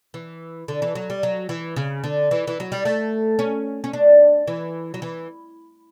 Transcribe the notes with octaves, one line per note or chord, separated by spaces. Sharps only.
E3
D3
E3
F#3
G3
F#3
E3
C#3
D3
E3
E3
F#3
G3
A3
C#4
C#4
D4
E3
F#3
E3